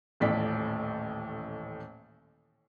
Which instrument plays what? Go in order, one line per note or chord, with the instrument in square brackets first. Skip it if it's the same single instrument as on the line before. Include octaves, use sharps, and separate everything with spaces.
[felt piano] D#1 A1 A2 D5 B6